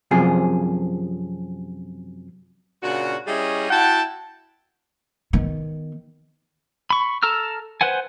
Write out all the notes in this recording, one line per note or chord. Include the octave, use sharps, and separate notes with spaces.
F#2 C3 F3 G#4
A#2 C#3 D4 F#4
G3 C#4 E4 G#4 C#5 D#5
E4 F#4 F#5 G5 A5
D#3 B3
B5 C#6
A4 A#5 E6 F6
B4 C5 F#5 G#5